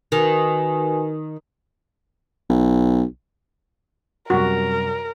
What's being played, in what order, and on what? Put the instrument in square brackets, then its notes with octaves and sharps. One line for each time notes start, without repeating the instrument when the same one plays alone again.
[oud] D#3 [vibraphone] F#4 B4 G#5
[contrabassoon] B1
[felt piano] F#2 C3 G3 [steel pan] F#4 [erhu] A#4